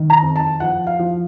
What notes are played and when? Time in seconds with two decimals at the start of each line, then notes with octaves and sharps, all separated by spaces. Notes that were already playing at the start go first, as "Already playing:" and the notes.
Already playing: D#3
0.10 A#5
0.22 F2
0.36 A5
0.60 F3 F#5
0.87 F5
0.99 F3